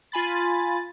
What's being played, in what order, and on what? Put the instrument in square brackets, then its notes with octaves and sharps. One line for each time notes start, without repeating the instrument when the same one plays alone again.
[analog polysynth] F4 G#5 B5 A6